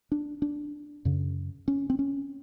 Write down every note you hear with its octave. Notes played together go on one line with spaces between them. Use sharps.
D4
D4
F#2 C#3
C#4
C4
C#4